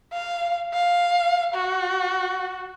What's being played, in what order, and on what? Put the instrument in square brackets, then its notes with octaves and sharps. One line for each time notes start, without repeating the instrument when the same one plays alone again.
[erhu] F5
F5
F#4